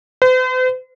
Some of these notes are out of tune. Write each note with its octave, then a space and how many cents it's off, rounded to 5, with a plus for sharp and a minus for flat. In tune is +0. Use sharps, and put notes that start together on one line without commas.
C5 -45